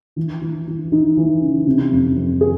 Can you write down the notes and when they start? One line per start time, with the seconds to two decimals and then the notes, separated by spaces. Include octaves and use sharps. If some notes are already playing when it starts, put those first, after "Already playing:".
0.16 E3
0.41 E3
0.67 E3
0.92 E3 D#4
1.17 E3
1.41 C#3
1.67 C3
1.91 F2
2.16 F2
2.41 G#4